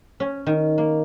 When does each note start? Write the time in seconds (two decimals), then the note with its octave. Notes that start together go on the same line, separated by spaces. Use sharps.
0.20 C#4
0.46 D#3
0.78 A#3